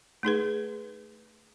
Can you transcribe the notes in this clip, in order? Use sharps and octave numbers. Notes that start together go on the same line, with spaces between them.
A3 D#4 G#4 B4